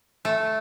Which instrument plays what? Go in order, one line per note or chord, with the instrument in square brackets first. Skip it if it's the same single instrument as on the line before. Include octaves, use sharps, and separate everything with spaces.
[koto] A3